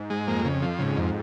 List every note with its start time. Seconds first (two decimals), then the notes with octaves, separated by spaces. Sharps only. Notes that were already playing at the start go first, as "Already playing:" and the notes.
Already playing: G#2
0.10 G#3
0.27 F2 A#3
0.45 C#3
0.62 F3
0.79 G#2 C#3
0.97 F2